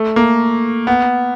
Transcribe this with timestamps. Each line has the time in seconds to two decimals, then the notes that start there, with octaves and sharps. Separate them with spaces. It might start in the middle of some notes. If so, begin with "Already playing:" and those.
Already playing: A3
0.16 A#3
0.87 B3